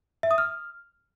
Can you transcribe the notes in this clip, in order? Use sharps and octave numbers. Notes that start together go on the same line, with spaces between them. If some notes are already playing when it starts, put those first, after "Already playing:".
E5
D#6
F6